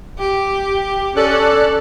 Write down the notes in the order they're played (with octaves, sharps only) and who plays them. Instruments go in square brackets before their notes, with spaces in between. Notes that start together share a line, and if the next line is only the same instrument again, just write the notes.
[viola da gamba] G4
[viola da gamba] C#4 [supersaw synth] A4 D5 F#6